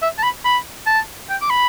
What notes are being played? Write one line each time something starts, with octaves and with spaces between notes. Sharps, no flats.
E5
A5
B5
B5
A5
G5
D6
B5